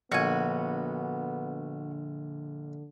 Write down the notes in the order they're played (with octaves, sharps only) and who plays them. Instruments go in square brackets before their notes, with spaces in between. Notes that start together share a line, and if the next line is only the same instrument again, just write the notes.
[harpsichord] A#1 [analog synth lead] D3 [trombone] B3 [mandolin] F#4 G#5